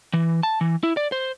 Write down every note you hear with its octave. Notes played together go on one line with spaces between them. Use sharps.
E3
A5
E3
E4
D5
C5